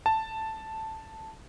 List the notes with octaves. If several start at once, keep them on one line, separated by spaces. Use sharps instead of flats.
A5